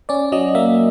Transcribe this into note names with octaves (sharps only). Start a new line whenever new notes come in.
C#4 D5
F#3 D#5
A#3 E5